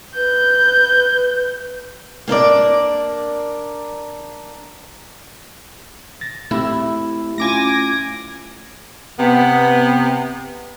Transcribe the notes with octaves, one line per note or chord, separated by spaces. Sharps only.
B4 G6
A#3 D4 A#4 D5
A6 A#6
A3 C4 E4 G4
A3 C#4 F4 G#5 D6 A#6
C3 B3